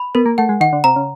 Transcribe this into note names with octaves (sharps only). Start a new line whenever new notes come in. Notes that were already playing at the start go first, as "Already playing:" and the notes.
Already playing: B5
B3 A#4
A#3
A3 F#5
G#3
D#3 F#5
D3
C3 A#5
C#3